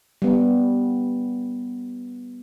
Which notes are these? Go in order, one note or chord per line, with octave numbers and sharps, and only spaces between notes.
G3 B3